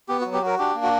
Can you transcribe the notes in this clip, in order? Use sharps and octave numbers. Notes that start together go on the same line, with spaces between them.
B3 G4
F#4
F#3
G4
F#4 A#4
D4 G4
A#3
F#4